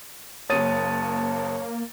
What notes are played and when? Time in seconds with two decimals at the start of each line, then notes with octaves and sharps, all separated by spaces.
0.50 F#1 A#3 C#5 A5 D#6 A6 D#7